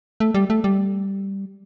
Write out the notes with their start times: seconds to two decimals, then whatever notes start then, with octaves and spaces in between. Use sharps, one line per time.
0.20 A3
0.34 G3
0.50 A3
0.64 G3